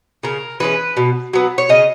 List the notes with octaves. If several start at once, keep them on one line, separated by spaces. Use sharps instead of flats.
C#3 A#4
E3 G#3 C#4 B4
B2
F#3 B3
C#5
C#3 D#5